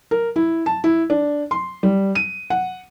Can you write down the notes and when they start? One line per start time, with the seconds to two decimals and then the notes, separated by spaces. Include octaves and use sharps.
0.11 A#4
0.36 E4
0.66 A5
0.84 E4
1.10 D4
1.51 C6
1.83 G3
2.15 D#7
2.50 F#5